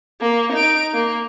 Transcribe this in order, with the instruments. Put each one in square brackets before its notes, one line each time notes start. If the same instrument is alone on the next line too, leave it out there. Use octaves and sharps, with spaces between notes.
[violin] A#3
D#4 D7
A#3